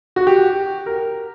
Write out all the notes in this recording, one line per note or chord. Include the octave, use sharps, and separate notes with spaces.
F#4
G4
A#4